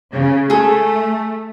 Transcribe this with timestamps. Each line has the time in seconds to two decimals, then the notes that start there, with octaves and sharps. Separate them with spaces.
0.12 C#3
0.50 A3 G#4 A4